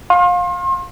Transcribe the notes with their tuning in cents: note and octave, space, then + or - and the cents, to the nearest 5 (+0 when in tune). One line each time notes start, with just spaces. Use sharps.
F5 +25 C6 +40